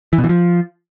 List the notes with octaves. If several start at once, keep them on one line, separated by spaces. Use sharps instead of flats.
E3
B2
E3
F3